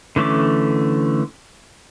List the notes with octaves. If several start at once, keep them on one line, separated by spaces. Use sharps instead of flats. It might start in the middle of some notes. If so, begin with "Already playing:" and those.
D3 E3 A3 C#4 D6